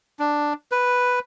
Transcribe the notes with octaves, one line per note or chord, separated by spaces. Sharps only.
D4
B4